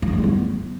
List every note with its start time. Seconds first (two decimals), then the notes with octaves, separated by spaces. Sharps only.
0.02 D#4
0.08 B3
0.13 G#3
0.18 G3
0.24 B3